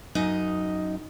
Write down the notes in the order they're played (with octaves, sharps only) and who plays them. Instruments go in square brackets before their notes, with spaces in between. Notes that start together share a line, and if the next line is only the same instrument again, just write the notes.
[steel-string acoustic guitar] F#2 D#4 D#5